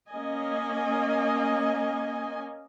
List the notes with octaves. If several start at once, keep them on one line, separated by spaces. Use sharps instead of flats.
A#3 C#4 D#5 G#5